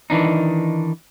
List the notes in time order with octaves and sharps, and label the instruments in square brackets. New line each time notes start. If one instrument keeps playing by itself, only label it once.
[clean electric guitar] D#3 E3 D4 D#4